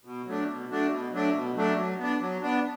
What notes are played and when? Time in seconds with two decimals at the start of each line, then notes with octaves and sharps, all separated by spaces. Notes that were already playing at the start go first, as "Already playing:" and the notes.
0.05 B2
0.26 F#3 A3 D4
0.48 B2
0.70 F#3 A3 D4
0.91 B2
1.12 F#3 A3 D4
1.34 B2
1.56 F#3 A3 D4
1.77 F#3
1.99 B3 D4
2.20 F#3
2.42 B3 D4